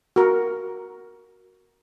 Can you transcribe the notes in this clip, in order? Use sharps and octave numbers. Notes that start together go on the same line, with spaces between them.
F#4 A#4